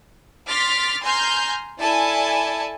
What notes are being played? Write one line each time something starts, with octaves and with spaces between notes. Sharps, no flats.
C6 D6 F6 A6 B6
G#5 A#5 C6 F6 G6
E4 A4 D5 G#5 A5